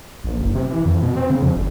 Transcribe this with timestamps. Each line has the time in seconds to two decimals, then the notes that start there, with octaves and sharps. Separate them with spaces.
0.24 A#1
0.40 F#1
0.55 C3
0.70 E3
0.86 F2
1.03 B2
1.16 C4
1.30 C#3
1.42 F2
1.56 G1